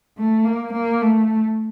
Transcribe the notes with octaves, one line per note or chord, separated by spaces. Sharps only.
A3
A#3
A#3
A3